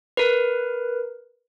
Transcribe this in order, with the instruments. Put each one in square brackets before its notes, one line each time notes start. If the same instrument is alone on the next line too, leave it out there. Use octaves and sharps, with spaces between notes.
[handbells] A#4 B4